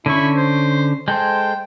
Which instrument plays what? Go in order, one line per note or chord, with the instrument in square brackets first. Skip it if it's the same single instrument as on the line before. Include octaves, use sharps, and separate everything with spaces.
[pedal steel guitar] D3 C#4 C#6 [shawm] E4
[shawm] C5
[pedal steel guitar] G#3 A4 C5 [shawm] G5